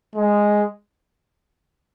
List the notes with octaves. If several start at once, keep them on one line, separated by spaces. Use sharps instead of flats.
G#3